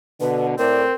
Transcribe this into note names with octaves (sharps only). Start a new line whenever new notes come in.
B2 D3 B4
A2 C4 A#4 D5